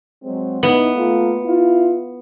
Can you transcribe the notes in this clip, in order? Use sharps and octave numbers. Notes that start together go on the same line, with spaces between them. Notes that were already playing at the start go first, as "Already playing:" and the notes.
F#3 G#3 C4
B3 D#4 E4
A3 A#3 F4
E4 F4